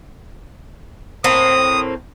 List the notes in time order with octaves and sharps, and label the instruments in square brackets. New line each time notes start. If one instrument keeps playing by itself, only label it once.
[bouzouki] A2 A#3 C4 [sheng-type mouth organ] D#6